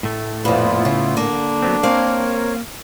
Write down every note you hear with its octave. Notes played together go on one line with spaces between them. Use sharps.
A2 A3
F2 A#2 B3 E4 F4 B4
C#3
D3 A#3 D4
F#3 B3 C4
A#3 C4 A#4 C#5 F5